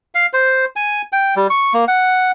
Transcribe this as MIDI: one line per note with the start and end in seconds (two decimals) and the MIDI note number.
0.15 0.26 77
0.33 0.65 72
0.76 1.02 80
1.13 1.34 79
1.36 1.47 55
1.50 1.73 85
1.74 1.85 58
1.88 2.31 78